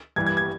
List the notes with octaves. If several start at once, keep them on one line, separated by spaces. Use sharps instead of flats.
G2 E3 G3 G#6
G#6
G#6